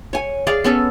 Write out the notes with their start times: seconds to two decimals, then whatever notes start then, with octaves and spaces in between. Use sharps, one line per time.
0.13 C#5 G#5
0.47 G#4 D5 F5
0.64 B3 C#4 A4